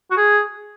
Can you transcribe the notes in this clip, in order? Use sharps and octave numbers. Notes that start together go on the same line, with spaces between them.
F#4
G#4